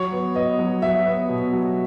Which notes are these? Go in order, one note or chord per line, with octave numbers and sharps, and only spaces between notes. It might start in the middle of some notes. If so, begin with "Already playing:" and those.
Already playing: F#3 C#5
B3
B3 D#5
F#3
F#3 E5
B3
B2
F#3